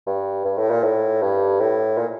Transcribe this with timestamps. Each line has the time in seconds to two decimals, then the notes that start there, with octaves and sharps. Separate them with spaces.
0.06 G2
0.45 G2
0.58 A2
0.71 A#2
0.84 A2
1.22 G2
1.60 A2
1.98 A#2